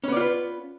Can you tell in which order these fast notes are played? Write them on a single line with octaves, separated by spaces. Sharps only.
C#4 B3 D5 F4 B4